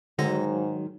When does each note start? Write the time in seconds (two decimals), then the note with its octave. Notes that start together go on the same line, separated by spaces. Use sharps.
0.19 G#2 D3 D#3 F#3 G#3 A#6